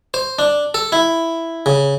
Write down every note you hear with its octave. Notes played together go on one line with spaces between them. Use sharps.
C5
D4
A4
E4
C#3